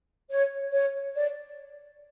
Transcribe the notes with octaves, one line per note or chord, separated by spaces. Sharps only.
C#5
C#5
D5